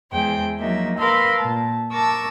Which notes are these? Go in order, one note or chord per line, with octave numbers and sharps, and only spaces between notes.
E2 E3 G#3 C5 G5
F3 F#3 A#3 D#4 E5
A#4 B4 F5 B5 C6 E6
A#2 A5
A#4 A5 C#6 D6 E6